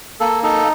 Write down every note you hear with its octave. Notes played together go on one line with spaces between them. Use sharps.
A#3 A4
D#4 A4